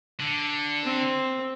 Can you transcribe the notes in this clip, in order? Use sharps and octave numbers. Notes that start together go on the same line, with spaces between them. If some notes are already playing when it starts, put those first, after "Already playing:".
D3
C4